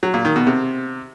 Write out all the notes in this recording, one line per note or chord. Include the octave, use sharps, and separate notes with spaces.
F#3
A#2
D#3
B2
C3